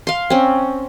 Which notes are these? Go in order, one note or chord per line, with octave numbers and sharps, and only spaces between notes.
F5 C6
C4 C#4